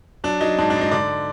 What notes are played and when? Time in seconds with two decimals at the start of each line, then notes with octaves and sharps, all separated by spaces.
0.24 F#3 D4
0.41 F#3 D#4
0.59 G#2 D4
0.70 D4
0.76 G#2
0.81 D#4
0.91 D3 D5